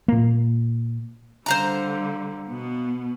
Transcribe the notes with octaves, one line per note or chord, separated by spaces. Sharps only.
A#2 A#3
D3 G3 C5 F5 A#5
B2 B3